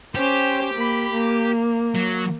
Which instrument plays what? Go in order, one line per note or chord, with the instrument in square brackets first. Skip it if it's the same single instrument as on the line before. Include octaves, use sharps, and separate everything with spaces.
[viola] C#4 C5 [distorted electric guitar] G4
[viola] A#3 B5
A#3
[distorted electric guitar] F#3